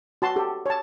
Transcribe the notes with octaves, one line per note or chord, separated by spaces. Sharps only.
F#4 A5 C6
G4 A4
C#5 A5